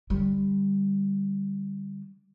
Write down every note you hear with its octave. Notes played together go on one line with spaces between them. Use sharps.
D3 G3